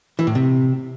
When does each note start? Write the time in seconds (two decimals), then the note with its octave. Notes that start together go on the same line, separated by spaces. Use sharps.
0.19 E3
0.27 A2
0.35 C3